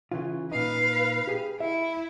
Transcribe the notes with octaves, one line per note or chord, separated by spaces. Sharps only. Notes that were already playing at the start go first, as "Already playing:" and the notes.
C#3 E3 F4
A#2 D#4 B4 F5
G4 G#4
E4 E5